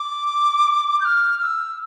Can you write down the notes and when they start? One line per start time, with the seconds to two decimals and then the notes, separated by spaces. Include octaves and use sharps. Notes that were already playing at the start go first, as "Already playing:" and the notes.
Already playing: D6
1.01 G6
1.05 F6
1.38 F6
1.43 E6